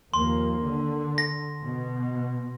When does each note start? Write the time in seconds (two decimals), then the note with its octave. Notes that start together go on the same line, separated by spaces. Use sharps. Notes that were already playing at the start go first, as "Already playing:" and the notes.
0.14 D#2 F3 A#3 C6
0.63 D3
1.18 A#6
1.62 B2